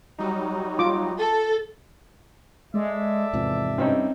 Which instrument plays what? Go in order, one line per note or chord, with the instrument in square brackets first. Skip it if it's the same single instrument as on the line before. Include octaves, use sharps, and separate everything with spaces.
[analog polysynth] F#3 G3 D#4
[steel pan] F4 D6
[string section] A4
[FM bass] G#3 [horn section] A4 D5 E5
[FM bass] E2 [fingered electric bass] G#2 C3 F3
[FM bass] G2 [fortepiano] C4 C#4 D#4